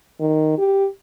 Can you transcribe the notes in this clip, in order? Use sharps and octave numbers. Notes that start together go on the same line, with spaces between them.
D#3
G4